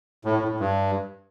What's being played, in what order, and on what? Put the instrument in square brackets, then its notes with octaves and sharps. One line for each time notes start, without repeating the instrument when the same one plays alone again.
[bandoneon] A2
A2
A2
G2